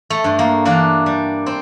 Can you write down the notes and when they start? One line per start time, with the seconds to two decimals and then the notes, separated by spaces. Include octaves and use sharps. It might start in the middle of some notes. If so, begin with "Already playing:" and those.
0.10 A3
0.24 G2
0.39 A#3
0.65 E3 A#3 D4
1.06 G3
1.46 C4